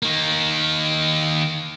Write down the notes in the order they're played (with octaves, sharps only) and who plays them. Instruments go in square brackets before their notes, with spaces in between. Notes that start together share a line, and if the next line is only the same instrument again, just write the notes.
[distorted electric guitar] D#3 A#3